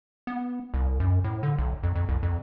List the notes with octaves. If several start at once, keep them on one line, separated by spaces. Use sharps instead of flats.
B3
C2
F#2
A2
D3
B1
F2
F2
C2
F2